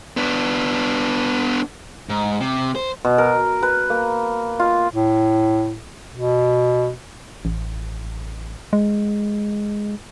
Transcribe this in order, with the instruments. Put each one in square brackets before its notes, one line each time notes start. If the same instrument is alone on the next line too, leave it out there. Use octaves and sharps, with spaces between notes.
[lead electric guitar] B3 D4
G#2
C3
C5
[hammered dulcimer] B2
A#4
B4
A#3
F4
[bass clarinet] A2
B2
[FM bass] A1
G#3